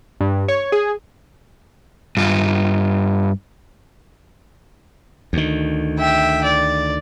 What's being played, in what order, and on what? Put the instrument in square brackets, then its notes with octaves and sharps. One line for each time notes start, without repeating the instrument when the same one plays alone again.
[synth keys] G2
C#5
G#4
[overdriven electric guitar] G2 F4
[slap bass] D2 D#3
[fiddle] E5 G5
D5